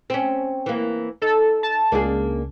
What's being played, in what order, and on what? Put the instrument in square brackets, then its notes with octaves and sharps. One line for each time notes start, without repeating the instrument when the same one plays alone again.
[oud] C4 C#4
E3 A#3
[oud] D#4 [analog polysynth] A4
[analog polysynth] A5
[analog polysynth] C#2 [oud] A#3 D4 G#4